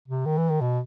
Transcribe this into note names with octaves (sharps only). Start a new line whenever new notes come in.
C3
D#3
E3
D#3
B2